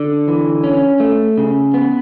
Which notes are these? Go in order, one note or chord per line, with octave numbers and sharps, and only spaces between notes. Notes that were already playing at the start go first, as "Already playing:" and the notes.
Already playing: D3 D4
E3
C#4
A3
C#3
B3